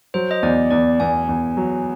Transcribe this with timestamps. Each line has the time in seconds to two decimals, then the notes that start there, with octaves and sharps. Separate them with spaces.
0.14 F#3 C5
0.31 D#5
0.43 E2 D5
0.71 E2 D5
1.00 E2 G#5
1.29 E2
1.57 F#3